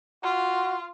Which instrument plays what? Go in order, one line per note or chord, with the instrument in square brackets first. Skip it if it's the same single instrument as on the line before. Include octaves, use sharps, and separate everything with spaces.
[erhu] F4 [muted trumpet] F#4